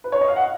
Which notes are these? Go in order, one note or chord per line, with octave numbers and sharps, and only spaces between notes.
B4
C#5
D#5
F5
F#5